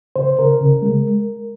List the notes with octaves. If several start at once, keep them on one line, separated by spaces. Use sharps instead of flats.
C#3 C5
C#3 A#4
C#3
G#3